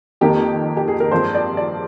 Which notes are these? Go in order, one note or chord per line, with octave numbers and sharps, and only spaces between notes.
F2 D#3 A#3 D#4 G4
G4
G#4
A#4
G2 F3 G#3 C4 C5
D5
D5